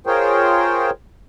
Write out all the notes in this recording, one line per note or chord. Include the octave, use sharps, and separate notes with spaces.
F4 G#4 A#4 C5 C#5 G5